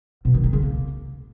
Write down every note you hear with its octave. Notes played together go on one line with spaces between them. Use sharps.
B2
D#3
G#3
C#3
A#3